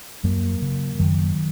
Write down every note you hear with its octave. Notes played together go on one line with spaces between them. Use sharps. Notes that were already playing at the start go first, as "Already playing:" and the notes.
F#2 F#3 A#3
C#3
F#2 D#3 F#3